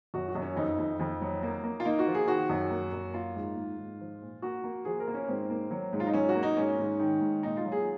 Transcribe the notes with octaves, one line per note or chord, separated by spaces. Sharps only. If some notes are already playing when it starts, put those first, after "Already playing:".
F#2 F#4
F#4
F#2
C#4
F2 D#4
F2
F2
F#3
A#3
A#3
F4
A#3 D#4
F#4
F3
G#4
D#3 F#4
F#2
A#3
F#2
A#3 F4
G#2
G#2
G#2
F3
A#2
A#3 F#4
A#3
F3 G#4
A#4
A#3
C#4
G#2 C4
A#3
F#3
G#2
F4
D#4
F#3 C#4
F#4
A#3
D#4
G#2 C#4
G#2
D#3
G#2
A#2 D#4
F4
F#3
G#4